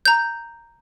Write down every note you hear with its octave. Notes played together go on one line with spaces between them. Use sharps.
A#5 G6